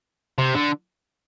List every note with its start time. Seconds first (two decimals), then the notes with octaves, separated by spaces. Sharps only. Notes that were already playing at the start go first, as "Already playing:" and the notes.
0.39 C3
0.55 D3